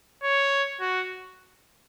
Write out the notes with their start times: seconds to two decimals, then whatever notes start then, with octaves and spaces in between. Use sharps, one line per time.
0.23 C#5
0.81 F#4